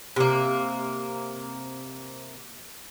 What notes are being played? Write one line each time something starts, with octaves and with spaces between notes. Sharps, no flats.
C3 A#3